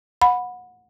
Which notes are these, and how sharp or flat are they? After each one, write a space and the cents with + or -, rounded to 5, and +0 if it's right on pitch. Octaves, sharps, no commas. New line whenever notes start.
F#5 -25 B5 +0